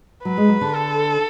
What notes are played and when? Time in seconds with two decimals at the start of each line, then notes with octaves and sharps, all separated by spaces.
0.24 F#3 B4
0.37 G#3
0.49 F#3
0.61 D3
0.74 A4